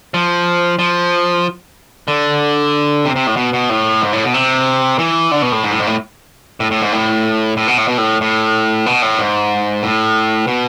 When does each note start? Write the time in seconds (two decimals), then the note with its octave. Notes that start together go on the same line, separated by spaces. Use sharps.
0.14 F3
0.79 F3
2.08 D3
3.05 C3
3.16 C3
3.27 A2
3.37 B2
3.53 B2
3.69 A2
4.01 G#2
4.13 A2
4.24 B2
4.34 C3
4.99 E3
5.31 D3
5.42 B2
5.52 A2
5.64 G#2
5.71 A2
5.79 G#2
5.87 A2
6.60 A2
6.71 A2
6.82 G#2
6.92 A2
7.57 A2
7.67 B2
7.78 A2
7.88 B2
7.98 A2
8.21 A2
8.86 B2
9.02 A2
9.19 G#2
9.83 A2
10.47 B2